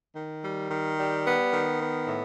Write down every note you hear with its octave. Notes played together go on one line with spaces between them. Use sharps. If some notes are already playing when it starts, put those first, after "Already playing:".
D#3
G3
D#3
G3
B3
D#3
B3
A2